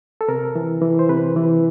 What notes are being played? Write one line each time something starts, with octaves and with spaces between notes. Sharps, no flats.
A4
C3 A#4
E3
E3
C5
C3 B4
E3